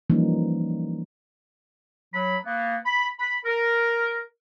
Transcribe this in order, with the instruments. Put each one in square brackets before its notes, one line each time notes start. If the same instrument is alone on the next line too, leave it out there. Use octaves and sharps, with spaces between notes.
[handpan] E3 F3 G3 A#3 C#4 D#4
[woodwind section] F#3 B5
A#3 B3
B5
B5
A#4